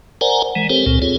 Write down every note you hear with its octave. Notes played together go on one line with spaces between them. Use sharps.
A#4 C5 D5 F#5 G#5 A#5
E3 G#3
C4 G4 A4 A#4 C5 C#5
C#2 A#2 C4 A4
C4 F4 G#4 A4 C#5